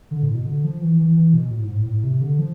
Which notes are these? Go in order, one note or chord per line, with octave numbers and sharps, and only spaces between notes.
D3
A2
B2
D3
F3
E3
E3
E3
B2
A2
G#2
A2
A2
C3
D3
F3